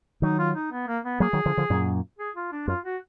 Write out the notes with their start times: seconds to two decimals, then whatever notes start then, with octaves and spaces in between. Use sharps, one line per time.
0.22 D#3 F#3 D#4
0.39 F4
0.55 D#4
0.72 B3
0.87 A#3
1.05 B3
1.20 F#3 A#3 G#4
1.33 D#3 F#3
1.46 D3 F3
1.57 D3 F3
1.70 F#2 A#2
2.19 G#4
2.36 F4
2.52 D4
2.68 F#2 F4
2.85 F#4